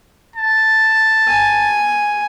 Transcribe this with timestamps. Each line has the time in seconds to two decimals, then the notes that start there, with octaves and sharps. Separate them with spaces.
0.36 A5
1.28 G#5